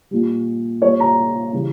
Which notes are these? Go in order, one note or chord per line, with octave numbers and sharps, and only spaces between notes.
A#2 G3
A#2 G3 C#5
A#5
C#3 E3 G3